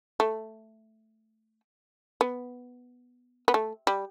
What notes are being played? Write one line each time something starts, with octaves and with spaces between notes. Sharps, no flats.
A3
B3
B3
A3
G3